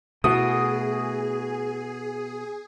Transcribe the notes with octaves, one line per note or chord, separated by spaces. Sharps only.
B2 A3 E4 F#4 G#4 D#6